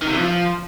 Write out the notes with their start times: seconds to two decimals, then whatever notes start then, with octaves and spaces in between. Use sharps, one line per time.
0.02 D#3
0.07 C3
0.13 E3
0.18 F3